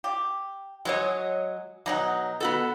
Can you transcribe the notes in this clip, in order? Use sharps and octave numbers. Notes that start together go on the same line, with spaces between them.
G4
F#3 G#3 C#5 D#5
B2 F#3 D#4 F#5
B3 F#4 A4